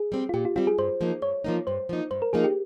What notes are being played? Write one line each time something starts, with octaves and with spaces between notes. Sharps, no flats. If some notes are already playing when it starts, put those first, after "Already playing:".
Already playing: G#4
G3 C4
F4
A#2 G4
F4
G3 C4 F4
G#4
G2 C5
F3 A#3 D#4
G2 C#5
F3 A#3 D#4
G2 C5
F3 A#3 D#4
G2 C5
A#4
F3 A#3 D#4 G#4
G4